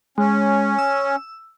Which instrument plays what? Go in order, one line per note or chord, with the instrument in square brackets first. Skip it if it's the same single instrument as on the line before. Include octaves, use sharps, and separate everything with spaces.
[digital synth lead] G#3 [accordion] C#4
[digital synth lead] E6